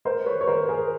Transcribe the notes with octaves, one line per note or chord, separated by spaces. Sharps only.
A#4 C5
B4 C#5
C#5
A#4 C5
G#4 A#4